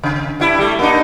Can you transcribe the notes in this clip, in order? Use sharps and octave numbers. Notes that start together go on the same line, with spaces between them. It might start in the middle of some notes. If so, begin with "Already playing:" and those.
C#3
G2 E4
G3 A3
A#3 D4 D#4